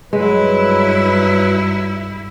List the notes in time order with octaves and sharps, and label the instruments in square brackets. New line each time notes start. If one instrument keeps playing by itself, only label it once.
[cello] G2 E4 [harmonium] F#3 B4 [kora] G#3